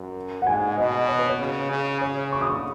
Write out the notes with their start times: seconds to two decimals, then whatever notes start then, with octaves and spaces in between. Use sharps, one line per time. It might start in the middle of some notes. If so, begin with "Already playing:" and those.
Already playing: F#2
0.42 F#5
0.47 G#2 G#5
0.78 B2 D#5
1.08 C#5
1.19 B4
1.29 C#5
1.40 C#3
1.71 C#3
2.01 C#3 C#5
2.33 C#6
2.41 D#6
2.50 C#6